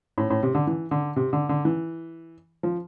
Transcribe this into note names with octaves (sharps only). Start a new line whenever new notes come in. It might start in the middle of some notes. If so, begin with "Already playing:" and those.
A2
A2
C3
D3
E3
D3
C3
D3
D3
E3
F3